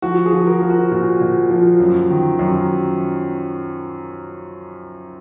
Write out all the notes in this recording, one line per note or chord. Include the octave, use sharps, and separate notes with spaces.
F3 F#4
G#4
F3
A#4
F3
F#4
A#2 F#4
A#2
F3
F#2
D#3
F#2